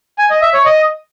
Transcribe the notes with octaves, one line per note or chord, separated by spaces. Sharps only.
G#5
D#5
E5
C#5
D#5